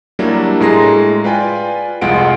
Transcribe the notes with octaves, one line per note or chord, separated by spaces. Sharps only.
F#3 G3 A#3 D4 E4
A2 G#3 G#4 A#5 C6 A#6
F4 B4 D5 G5 G#5
C2 F2 G#3 F4 F#5 D7